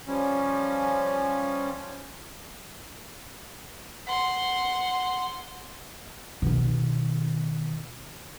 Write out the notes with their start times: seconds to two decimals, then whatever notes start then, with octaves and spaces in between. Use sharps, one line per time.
0.07 F3 G3 C#4
4.07 F#5 C6
6.42 B2 D#3